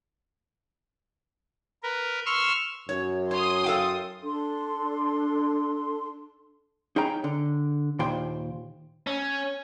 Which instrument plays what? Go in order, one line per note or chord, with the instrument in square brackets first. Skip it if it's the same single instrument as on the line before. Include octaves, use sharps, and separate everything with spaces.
[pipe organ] A#4 B4
C6 C#6 E6 F6
[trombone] F#2 [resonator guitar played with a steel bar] C#5
[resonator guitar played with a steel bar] C#5 [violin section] C6 D#6
[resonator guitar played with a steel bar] A4 F5 G5
[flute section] D4 A4 C6
[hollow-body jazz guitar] D#4 G#4 C#5 G5 A#5
D3
D#2 A#2 C5 G5
[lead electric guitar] C#4